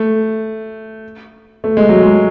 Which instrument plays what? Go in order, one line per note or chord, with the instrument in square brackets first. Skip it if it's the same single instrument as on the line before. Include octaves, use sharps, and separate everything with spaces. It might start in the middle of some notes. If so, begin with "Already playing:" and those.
Already playing: [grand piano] A3
A3
G#3
F#3
G#3